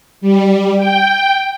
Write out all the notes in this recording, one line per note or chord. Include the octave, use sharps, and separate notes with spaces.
G3
G5